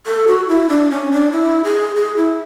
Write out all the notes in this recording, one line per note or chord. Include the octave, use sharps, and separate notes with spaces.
A4
F#4
E4
D4
C#4
D4
E4
G#4
G#4
E4